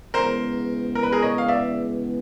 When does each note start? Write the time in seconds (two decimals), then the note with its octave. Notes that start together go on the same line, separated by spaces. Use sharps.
0.14 C#3 E3 G#3 B3 A#4 C5
0.95 A#4
1.03 B4
1.12 G#4 A#4
1.22 C#5 D#5
1.38 F5
1.48 D5 E5